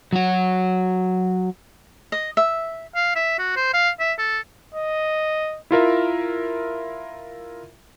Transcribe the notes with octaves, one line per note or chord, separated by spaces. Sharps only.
F#3 F#4
D#5
E5
F5
E5
F#4
C5
F5
E5
A4
D#5
E4 F4 A#4 E5